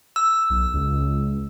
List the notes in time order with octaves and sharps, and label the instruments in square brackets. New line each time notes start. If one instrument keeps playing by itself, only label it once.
[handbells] E6
[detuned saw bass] B1
C#2